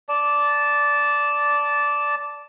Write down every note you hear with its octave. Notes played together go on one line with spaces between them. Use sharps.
D5 A5